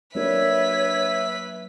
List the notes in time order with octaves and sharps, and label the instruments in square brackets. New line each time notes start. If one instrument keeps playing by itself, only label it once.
[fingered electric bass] F#3 A#3 D4 [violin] B4 B6 [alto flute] C#5 [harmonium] E5